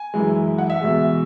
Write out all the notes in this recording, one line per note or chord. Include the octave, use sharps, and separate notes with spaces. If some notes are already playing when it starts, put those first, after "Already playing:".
Already playing: G#5
F#2 E3 G#3
F#5
E5
E2 B2 G#3